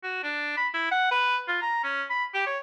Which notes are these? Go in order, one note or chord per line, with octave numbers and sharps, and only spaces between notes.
F#4
D4
B5
E4
F#5
B4
F4
A#5
C#4
B5
G4
C#5